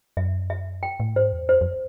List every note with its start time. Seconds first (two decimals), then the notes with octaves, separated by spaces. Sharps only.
0.17 F#2 E5
0.50 E5
0.83 G5
1.00 A2
1.15 G#2 C5
1.32 E2
1.49 F2 C5
1.61 F2